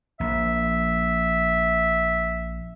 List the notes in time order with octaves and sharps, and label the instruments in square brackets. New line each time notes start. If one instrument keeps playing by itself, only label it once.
[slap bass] A#1 [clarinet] E5